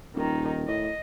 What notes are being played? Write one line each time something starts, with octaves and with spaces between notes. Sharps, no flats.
D#1 D#3 D#4
A2 D#5